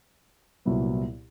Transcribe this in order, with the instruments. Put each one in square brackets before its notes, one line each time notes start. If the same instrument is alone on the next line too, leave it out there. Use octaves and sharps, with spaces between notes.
[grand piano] C2 A#2 F#3 B3 E4